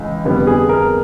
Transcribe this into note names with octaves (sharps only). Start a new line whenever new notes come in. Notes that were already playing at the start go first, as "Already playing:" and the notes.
Already playing: C#2 E3 G#3
G1 F2 D3 G3 B3
G#4
A#4